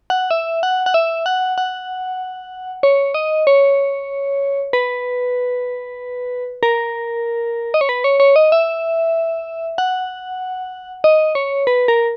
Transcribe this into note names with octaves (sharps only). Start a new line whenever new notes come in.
F#5
E5
F#5
F#5
E5
F#5
F#5
C#5
D#5
C#5
B4
A#4
D#5
C#5
B4
C#5
C#5
D#5
E5
F#5
D#5
C#5
B4
A#4